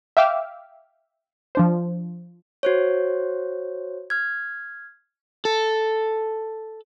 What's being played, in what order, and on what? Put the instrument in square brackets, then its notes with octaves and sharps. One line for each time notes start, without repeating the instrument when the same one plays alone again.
[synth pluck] E5 F5 G5 D6 E6 F6
F3 D4 C5
[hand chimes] F#4 C5 C#5
F6 G#6
[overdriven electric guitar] A4